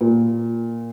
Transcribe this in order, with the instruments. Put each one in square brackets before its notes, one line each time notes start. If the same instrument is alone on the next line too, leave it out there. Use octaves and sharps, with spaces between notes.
[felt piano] A#2